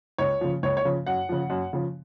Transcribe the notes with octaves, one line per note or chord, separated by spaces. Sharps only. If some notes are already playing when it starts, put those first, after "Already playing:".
C#2 C#5
C#3 F3
C#2 C#5
C#5
C#3 F3
F#2 F#5
C#3 F3
F#2
C#3 F3